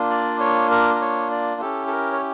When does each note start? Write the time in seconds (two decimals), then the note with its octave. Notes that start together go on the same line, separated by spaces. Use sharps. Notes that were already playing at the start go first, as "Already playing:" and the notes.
Already playing: A#3 D4 F4
0.10 D5
0.40 C#5
0.71 A#4
0.94 A#4
1.01 C#5
1.31 D5
1.61 C#4 E4 G4 A4
1.87 A4
1.92 A#4
2.12 C#5